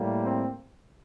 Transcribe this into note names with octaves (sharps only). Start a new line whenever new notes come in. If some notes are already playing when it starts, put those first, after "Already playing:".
Already playing: A2 G3 A#3
C4